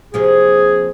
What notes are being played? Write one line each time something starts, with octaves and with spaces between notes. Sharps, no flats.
C3 F3 A#3 G#4